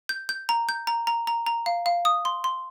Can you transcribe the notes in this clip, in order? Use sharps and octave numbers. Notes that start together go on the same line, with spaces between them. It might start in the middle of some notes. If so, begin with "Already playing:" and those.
G6
G6
A#5
G6
A#5
A#5
A#5
A#5
F5
F5
D#6
C6
C6